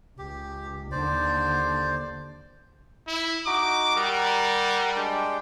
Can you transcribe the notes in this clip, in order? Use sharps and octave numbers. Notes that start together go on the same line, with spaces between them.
C#2 G4
D#2 D3 C5 D5
E4
D#4 F#4 D#5 D6
G3 A#4 F#5 A#5
G#3 D4 G5